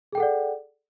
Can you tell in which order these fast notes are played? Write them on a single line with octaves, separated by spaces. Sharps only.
G#4 G5 A4 F#5 D5